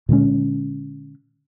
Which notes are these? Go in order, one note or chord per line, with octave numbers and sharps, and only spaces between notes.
A#2 D3 G#3 C#4